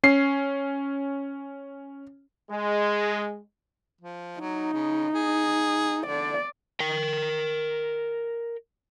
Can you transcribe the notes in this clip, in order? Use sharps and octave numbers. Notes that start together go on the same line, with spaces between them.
C#4 C7
G#3
F3
F#3 D#4
C#3
G#4
D3 D5
A#4 G5